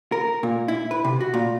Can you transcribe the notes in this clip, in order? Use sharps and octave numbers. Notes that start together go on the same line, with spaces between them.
A#4
A#2
E4
B4
C3
F#4
A#2